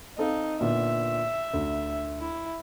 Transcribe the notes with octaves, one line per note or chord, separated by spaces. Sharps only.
C4 D#4 A4 F5
A#2 D3 B3 E5
D2
E4